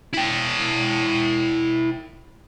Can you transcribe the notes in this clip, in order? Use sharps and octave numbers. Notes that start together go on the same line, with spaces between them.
E4 G5